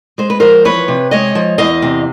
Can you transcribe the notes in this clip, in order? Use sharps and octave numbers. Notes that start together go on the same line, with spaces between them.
G#3 C5
B4
F3 A#4 C5
E2 B4 C#5
C3
G#3 C#5 D#5
F3
E2 D#5 F5
C3